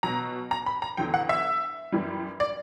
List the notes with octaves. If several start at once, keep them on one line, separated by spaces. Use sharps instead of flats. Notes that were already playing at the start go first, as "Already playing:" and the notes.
B2 F#3 A#5
A#5
B5
A#5
E2 D3 F#3 G5
F#5
E5
F#2 E3 G3
D5